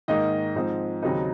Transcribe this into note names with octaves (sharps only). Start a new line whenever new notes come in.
G#2 D#3 A#3 D#4 D#5
G#2 F3 C4 D#4
D#2 C#3 F#3 C4 D#4